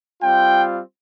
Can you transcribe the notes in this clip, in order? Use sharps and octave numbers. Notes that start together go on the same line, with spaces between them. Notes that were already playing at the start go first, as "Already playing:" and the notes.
G3 C4 F4 G5